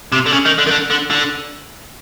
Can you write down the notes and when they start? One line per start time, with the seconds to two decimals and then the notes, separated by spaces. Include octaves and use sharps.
0.12 C3
0.26 D3
0.32 C#3
0.45 D#3
0.58 D3
0.66 D#3
0.71 D3
0.90 D3
1.10 D3